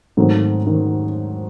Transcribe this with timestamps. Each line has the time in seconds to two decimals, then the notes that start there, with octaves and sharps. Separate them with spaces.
0.17 G#2 D#3 F#3 A3 C4
0.67 D#3